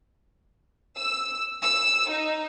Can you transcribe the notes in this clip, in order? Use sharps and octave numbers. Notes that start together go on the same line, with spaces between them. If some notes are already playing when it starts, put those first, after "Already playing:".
E6
E6
D#4